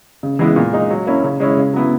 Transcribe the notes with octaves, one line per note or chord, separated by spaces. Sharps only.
C#3
E3 G#3 B3 E4
A#2
G#3 D#4
F#3
A#3 C#4 E4
C#3
G#3 C#4 E4
C#3
F#3 B3 E4